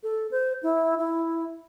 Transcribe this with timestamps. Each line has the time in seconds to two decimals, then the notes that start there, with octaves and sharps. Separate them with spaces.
0.03 A4
0.31 C5
0.63 E4
0.98 E4